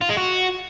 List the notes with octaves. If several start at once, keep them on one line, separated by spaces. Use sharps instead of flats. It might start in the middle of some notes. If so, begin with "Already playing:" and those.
F4
G#3
F#4